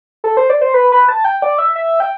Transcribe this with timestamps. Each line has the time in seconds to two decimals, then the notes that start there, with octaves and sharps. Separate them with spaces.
0.24 A4
0.37 C5
0.50 D5
0.61 C5
0.74 B4
0.92 B4
1.09 A5
1.24 G5
1.42 D5
1.58 E5
1.75 E5
2.00 G5